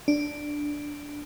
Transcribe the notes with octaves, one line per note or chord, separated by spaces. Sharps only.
D4